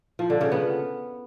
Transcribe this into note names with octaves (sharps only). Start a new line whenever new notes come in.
F3
D3
C#3
B3